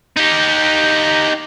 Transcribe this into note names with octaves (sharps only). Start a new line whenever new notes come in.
D#4 G4